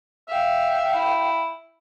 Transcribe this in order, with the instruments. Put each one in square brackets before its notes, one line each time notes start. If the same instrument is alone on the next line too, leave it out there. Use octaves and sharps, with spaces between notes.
[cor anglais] E5 [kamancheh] F5 G5
[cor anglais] E4